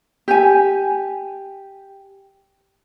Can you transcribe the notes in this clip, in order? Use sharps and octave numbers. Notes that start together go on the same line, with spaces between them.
G4 G#5